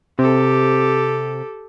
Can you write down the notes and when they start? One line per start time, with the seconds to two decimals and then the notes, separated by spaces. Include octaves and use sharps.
0.19 C3 G4 A4